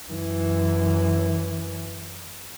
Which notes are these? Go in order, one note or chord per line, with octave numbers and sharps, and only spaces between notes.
F#2 E3